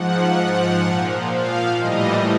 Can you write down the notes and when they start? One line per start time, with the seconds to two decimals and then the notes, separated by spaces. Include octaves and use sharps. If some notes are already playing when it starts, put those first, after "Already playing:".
Already playing: G#2 F3 F#5
0.82 A#2 F3
1.30 F5
1.78 A2 E3 G3 D#5